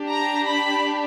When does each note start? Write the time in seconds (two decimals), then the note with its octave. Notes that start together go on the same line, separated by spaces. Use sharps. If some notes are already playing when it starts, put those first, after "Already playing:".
Already playing: D4 G4
0.10 A#5
0.47 B5